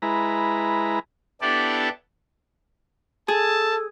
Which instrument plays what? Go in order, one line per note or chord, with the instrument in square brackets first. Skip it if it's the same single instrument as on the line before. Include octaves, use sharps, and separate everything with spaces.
[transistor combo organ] G#3 E4 B4 A#5
[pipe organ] B3 D4 E4 G4 A4 D5
[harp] G#4 [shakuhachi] A4 [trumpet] A5